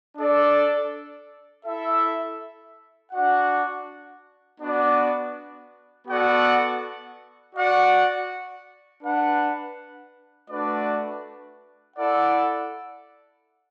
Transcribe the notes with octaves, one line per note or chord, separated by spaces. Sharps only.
D4 A4 D5
E4 A4 E5
D4 F#4 D5 F#5
B3 D4 F#4 D5
B3 F#4 A4 D5 F#5
F#4 D5 F#5
D4 B4 F#5
A3 D4 F#4 B4 D5
E4 A4 D5 F#5